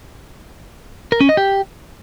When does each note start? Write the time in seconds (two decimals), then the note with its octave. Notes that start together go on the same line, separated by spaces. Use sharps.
1.12 A#4
1.21 C#4
1.29 D#5
1.37 G4